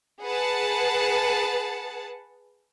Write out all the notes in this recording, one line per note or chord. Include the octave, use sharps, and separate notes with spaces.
G#4 B4 F#5 A5